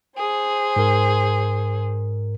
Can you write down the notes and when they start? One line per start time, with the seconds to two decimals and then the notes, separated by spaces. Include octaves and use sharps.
0.18 G#4 C5
0.76 G#2 A#4